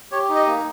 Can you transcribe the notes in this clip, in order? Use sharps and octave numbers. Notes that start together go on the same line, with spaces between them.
G4 C#5
D#4
D#5
A#3